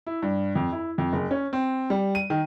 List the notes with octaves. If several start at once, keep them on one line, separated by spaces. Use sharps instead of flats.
E4
G2
F2
E4
F2
F#1
C#4
C4
G3
D#7
D#3